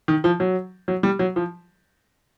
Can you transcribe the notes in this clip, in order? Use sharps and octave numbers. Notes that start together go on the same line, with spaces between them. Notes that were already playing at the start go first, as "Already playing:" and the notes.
D#3
F3
F#3
F#3
G3
F#3
F3